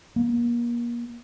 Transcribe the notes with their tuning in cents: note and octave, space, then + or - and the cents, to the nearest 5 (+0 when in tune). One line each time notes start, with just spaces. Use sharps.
A#3 +35